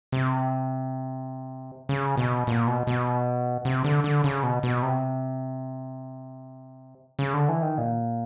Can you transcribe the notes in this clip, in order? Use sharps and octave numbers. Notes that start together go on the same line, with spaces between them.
C3
C#3
B2
A#2
B2
B2
C3
D3
D3
C#3
B2
B2
C3
C#3
D3
E3
D#3
A#2